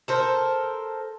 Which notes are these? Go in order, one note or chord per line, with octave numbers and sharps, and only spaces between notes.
A4 A#4 C5